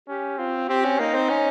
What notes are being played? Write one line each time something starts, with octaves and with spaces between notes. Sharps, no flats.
C#4 G4
C4 F4
C4 G4
C#4
A#3 D#4
C4
C#4